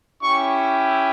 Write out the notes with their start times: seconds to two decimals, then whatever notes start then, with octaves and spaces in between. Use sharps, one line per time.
0.22 C#4 E4 G4 C#6